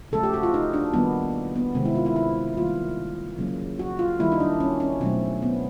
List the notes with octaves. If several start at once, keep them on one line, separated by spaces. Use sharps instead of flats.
C#3 F3 A3 A4
G4
F#4
F4
D#4
D4
D#3 G3 A#3 B3
B3
C3 D#3 G#3 C4
E4
F4
E4
E4
D#3 G3 A#3 F4
C#3 F#3 A#3
F#4
F4
D#3 G3 A#3 E4
D#4
D4
C#4
C#4
B2 F#3 A3 C4
B3